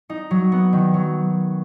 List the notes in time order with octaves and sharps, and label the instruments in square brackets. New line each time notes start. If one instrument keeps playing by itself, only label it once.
[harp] D#4
F#3
B3
D#3
F#3